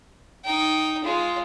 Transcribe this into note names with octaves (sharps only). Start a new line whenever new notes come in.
D#4 G5
G#3 F4